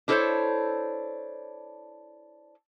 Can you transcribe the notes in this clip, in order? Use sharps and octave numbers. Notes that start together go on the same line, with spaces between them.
D4 E4 A4 A#4 C5 C#5